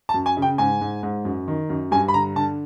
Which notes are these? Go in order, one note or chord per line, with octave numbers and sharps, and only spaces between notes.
A5
F#2
G#5
C#3
G5
G#2 G#5
G#2
G#2
F#2
D#3
F#2
G2 G#5
B5
D3 A#5
D3 A5